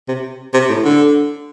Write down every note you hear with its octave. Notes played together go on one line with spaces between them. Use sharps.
C3
C3
A2
D3